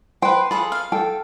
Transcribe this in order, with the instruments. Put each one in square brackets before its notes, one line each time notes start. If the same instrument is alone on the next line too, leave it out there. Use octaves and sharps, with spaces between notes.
[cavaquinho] B4 C5 [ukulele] G5
[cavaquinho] F4 G#4 A4 [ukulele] B5
[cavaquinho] F5
[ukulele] A4 G5